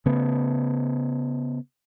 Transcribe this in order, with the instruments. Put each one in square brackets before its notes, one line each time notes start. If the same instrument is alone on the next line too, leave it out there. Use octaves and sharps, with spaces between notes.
[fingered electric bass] C#3 A3 B3